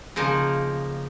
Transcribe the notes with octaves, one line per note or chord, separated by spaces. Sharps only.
C#3 F3 A#3 D#4